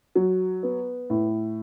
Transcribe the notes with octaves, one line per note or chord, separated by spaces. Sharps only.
F#3
B3
A2